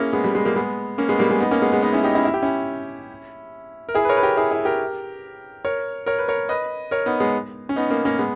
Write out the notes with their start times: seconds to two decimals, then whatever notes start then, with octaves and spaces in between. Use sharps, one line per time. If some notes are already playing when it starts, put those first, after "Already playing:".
Already playing: A#3 C#4 E4 G#4
0.13 G#3 B3
0.24 G3
0.35 G#3
0.45 G3 A#3
0.56 G#3 B3
0.98 A#3 C#4
1.09 G#3 B3
1.19 G3 A#3
1.29 G#3 B3
1.40 B3 D#4
1.51 A#3 C#4
1.62 G#3 B3
1.72 G#3 B3
1.83 B3 D#4
1.93 C#4 E4
2.04 D#4 G4
2.15 C#4 E4
2.25 E4
2.34 G4
2.43 C#4 E4
3.89 A#4
3.95 E4 G#4
4.05 B4
4.09 A#4 C#5
4.17 B4
4.23 G4 A#4
4.37 E4 G#4
4.51 E4 G#4
4.65 G4 A#4
5.65 A#4 C#5
6.06 A#4 C#5
6.19 B4
6.28 A#4 C#5
6.49 B4 D#5
6.91 A#4 C#5
7.06 B3 D#4
7.20 G#3 B3
7.69 C#4
7.76 B3 D#4
7.90 A#3 C#4
8.05 A#3 C#4
8.19 G#3 B3